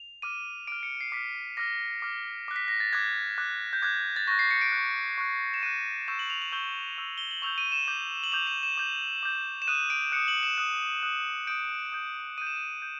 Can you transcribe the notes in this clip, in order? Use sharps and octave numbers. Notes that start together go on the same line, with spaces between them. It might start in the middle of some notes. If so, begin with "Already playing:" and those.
Already playing: F7
D6 F6 D#7
D6 F6 D7
C#7
C7
D6 F6 B6
D6 F6 A#6
D6 F6
D6 F#6
B6
A#6
A6
D6 F#6 G#6
D6 F#6
G6
D6 F#6 G#6
A6
C#6 F#6 A#6
C7
C#7
D7
F#6
C#6
C#6 F#6
E7
C#6 F#6 D#7
C#6 E6 G6 E7
F#7
F7
F#7
C#6 E6 G6 G7
C#6 E6 G6
G7
F#7
C#6 E6 G6 F7
D#7
E7
D6 G6
F#7
D6 G6 F7
E7
E7
D6 G6
D6 G6
E7
D#6 F#6 D#7
D7
D#6 F#6 C#7
F#7
E7
D#6 F#6
D#6 F#6
D#6 G6 D7
D#6 G6
D#6 G6 D#7
E7
D#7
G6